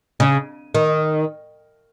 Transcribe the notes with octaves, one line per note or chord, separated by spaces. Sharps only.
C#3
D#3